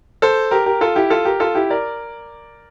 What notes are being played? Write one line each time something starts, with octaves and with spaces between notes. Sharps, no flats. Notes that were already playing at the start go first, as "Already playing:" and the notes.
A4 C5
G4 A#4
G4 A#4
F4 A4
E4 G4
F4 A4
G4 A#4
F4 A4
E4 G4
A#4 D5